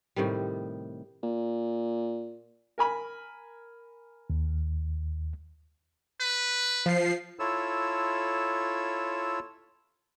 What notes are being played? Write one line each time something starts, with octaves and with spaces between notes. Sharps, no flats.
A2 C3 D#3 G3
A#2
A#4 G#5 B5
D#2
B4
F3 C7
E4 F4 A4 C#5 E6